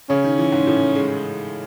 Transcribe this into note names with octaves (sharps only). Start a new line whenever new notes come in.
C#3 C#4
D#3
E3
G#2
A2
G#3